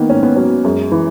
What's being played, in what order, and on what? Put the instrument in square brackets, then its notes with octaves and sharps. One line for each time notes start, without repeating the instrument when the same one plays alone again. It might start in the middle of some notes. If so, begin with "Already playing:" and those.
Already playing: [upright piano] D#3 [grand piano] A#3 B3
[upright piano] G#2 [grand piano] C#4
[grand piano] B3
[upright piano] F#3 [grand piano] C#4
[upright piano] F#2 [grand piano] G#3
[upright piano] E3